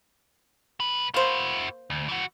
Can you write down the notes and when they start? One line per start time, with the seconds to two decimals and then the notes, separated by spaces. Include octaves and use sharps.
0.80 B1 B4
1.14 A#3 E4 F#4 C5
1.90 D2
2.09 E3 F#4